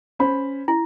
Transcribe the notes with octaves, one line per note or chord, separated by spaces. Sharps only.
C#4 C5 B5
E4